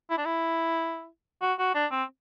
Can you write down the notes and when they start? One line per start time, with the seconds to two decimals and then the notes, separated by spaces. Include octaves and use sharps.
0.10 E4
0.17 D4
0.25 E4
1.42 F#4
1.59 F#4
1.74 D4
1.91 C4